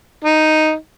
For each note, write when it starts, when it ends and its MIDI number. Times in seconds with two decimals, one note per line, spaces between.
0.24 0.74 63